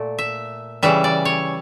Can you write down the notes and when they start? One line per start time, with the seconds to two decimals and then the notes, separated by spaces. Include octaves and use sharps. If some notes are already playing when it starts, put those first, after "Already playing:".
Already playing: A#2 A3
0.19 E5
0.83 C#3 E3 G3 E5
1.04 D5
1.25 C#5